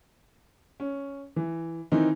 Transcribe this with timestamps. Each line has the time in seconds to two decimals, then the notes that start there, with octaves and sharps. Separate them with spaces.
0.80 C#4
1.36 E3
1.92 D#3 E3 C4 D#4